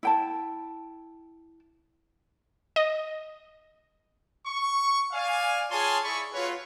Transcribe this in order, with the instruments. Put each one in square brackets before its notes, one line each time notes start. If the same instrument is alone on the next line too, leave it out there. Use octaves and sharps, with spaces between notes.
[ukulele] E4 G5 A5
[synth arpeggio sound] D#5
[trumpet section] C#6
D5 F5 G#5
F4 G#4 C#5 G#5 A5 C6
E4 G#4 D5 B5 C#6
A3 F4 F#4 B4 C#5